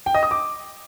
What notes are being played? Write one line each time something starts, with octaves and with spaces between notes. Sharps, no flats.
G5
D#5
D#6
D6